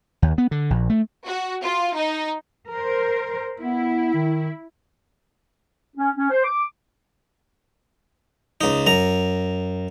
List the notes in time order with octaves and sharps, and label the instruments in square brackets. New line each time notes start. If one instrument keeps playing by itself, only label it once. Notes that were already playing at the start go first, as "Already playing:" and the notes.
[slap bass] D#2
B3
D3
A#1
A3
[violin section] F#4
F4
D#4
[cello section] A#4 C5
[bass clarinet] B3 [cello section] E4
[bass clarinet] D#3
[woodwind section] C#4
C#4
C5
D6
[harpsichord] C#2 D#4
F#2 A#5